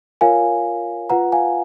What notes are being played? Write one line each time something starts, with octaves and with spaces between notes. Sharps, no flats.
F4 A#4 C#5 F5 G#5
F4 B4 F#5 A#5
F5 G#5